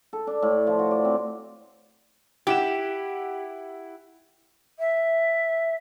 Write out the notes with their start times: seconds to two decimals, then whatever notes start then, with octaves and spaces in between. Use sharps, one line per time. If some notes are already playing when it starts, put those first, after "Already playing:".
0.13 A4
0.27 D4
0.42 A2
0.67 F3
0.79 F#4
0.91 D5
1.05 C4
2.47 E4 G4 F#5 E7
4.79 E5